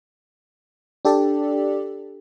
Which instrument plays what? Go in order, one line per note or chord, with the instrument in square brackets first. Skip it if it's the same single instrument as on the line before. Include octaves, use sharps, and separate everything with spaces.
[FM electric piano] D4 G4 A4 D5